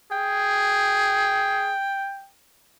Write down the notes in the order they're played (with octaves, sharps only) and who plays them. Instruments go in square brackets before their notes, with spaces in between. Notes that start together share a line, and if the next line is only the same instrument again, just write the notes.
[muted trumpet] G#4 [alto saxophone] G5